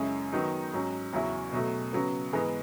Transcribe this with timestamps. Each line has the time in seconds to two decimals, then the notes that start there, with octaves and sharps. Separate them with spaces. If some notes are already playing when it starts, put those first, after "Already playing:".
Already playing: F#2 C#3 G#3 C#4 E4
0.32 D#3 F#3 B3 D#4
0.73 G#2 F#3 C#4
1.13 E2 C#3 F#3 C#4 E4
1.53 B2 F#3 A3
1.93 C#3 F#3 B3
2.32 G#2 E3 G#3 B3